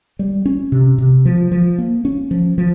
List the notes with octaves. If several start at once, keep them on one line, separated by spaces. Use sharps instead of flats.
G3
C#4
C3
C3
F3
F3
A#3
C#4
F3
F3